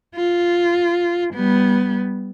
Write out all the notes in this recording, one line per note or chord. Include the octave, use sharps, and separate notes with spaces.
F4
G3 B3